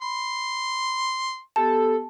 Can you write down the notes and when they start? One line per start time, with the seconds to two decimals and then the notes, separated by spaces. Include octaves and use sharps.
0.02 B5 C6
1.56 B3 G4 A4 A5